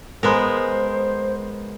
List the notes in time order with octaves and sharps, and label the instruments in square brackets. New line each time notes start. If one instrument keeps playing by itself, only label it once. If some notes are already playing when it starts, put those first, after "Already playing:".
[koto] G#3 B3 A#4 [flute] C5